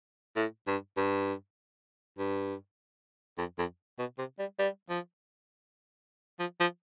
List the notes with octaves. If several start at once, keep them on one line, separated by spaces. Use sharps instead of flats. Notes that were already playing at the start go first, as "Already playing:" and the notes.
A2
G2
G2
G2
F2
F2
B2
C3
G3
G3
F3
F3
F3